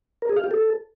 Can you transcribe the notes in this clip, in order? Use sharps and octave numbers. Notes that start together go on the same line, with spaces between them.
A#4
G#4
F5
G4
A4